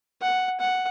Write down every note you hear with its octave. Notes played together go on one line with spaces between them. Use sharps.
F#5
F#5